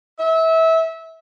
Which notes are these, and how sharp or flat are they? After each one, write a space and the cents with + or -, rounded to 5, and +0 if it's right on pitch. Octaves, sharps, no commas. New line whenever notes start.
E5 -25